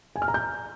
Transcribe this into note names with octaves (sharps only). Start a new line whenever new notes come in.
G#5
F6
A#5
G6